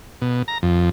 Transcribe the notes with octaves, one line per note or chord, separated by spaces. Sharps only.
B2
A#5
F2